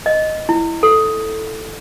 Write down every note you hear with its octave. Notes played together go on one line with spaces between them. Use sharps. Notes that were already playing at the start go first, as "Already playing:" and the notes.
D#5
E4
A4